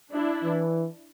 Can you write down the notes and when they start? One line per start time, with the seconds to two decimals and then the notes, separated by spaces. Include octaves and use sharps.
0.12 D4 E4
0.43 E3